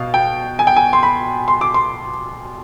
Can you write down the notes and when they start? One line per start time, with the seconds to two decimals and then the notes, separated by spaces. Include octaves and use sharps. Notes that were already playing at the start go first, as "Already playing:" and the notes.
Already playing: B2 F5
0.14 G5
0.59 G#5
0.67 G5
0.76 G#5
0.93 C6
1.03 B5
1.48 C6
1.61 D6
1.74 C6